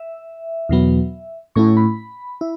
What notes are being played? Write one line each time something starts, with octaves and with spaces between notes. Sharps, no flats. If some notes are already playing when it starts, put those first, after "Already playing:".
Already playing: E5
E2 B2 F#3 B3
A2 A3 C#4 E4 C#6
B5
E4